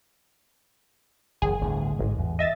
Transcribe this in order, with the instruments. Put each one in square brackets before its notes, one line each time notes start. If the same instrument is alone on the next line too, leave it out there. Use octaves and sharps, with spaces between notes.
[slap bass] F#1 E2 D#3 [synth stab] G#4
[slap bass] G1 D2 A2
[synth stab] A1 [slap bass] G#2 G#3
[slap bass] E2
[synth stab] D#5 E5 A6